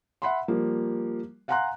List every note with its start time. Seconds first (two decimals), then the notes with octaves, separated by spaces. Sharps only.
0.22 E5 F#5 B5 C6
0.48 F3 G3 A#3
1.48 F5 F#5 G#5 A#5 C6 F#6